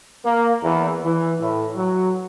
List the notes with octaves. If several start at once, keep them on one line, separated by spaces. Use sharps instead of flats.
A#3
E2
E3
A2
F#3